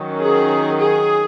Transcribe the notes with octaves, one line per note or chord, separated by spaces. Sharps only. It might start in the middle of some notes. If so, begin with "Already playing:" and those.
Already playing: D#3 F#3 C#4
G#4
G#4